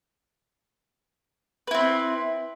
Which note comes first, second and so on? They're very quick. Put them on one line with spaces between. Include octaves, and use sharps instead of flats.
B4 E4 C4